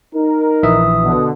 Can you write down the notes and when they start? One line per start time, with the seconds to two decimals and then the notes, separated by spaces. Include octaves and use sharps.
0.15 D#4 A#4
0.63 A#1 E3 E5 D#6
1.03 B2 D3